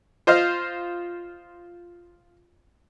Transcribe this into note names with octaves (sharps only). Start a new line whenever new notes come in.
F4 C5 D#5 F5